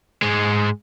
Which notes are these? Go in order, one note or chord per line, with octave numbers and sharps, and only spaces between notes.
G#2 G#3